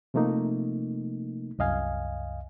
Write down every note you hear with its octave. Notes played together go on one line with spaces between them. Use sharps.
C3 F3 A3 A#3 D#4
C2 F#2 D#5 F5 G#5